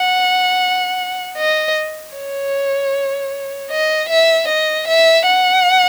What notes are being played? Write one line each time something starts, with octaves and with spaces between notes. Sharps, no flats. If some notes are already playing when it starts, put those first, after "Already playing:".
Already playing: F#5
D#5
C#5
D#5
E5
D#5
E5
F#5